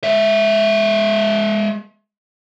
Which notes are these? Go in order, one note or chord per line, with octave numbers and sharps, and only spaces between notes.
G#3 E5